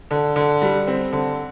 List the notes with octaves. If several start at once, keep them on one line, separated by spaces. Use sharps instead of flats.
D3
D3
G3
C4
D3